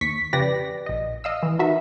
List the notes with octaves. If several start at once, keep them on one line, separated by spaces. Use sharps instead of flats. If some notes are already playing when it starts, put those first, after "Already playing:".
D#2 C#6 B6
F2 C#3 G4 B4 D5 A#6
A#1 D#5
D#5 F5 E6
E3
D#4 F#4 A#4 B4 E5